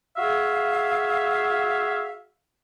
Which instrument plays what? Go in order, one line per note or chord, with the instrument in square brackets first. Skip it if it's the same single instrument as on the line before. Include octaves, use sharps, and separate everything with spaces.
[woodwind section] F#4 G#4 E5 F5